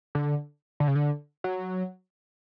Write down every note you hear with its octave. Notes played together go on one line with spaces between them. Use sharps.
D3
D3
C#3
D3
F#3